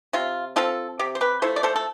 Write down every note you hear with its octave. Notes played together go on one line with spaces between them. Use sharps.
C3 F4
F3 C4 F4 A4
C3 G4
C5
G4 B4
F3 A3 E4 A4 C5
D5
A4 C5
A4